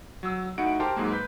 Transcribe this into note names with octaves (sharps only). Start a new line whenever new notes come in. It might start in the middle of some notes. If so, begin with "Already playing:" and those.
F#3 E6
A2 D#4 F#4 F#5 D7
G4 A#4 C5 G5 A5 C6
G#2 F#3 G#3 A#3
B4 G6 B6